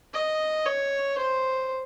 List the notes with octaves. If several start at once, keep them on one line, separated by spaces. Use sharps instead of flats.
D#5
C#5
C5